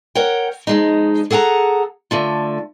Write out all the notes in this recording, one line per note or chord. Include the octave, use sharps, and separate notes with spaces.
A#4 C#5 F#5 G5
F2 G#3 D#4
G#4 A4 F#5 G#5 A#5
D3 A3 F4